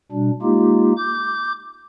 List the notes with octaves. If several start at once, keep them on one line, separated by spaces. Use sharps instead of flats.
B2 G3 D4
G#3 A#3 D#4 F4 G4
D6 G6